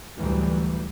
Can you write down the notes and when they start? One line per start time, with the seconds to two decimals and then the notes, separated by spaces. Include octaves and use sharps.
0.19 D2 A2 E3 F#3 G3